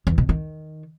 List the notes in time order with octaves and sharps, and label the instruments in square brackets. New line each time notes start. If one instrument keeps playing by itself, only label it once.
[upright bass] E2
B2
D#3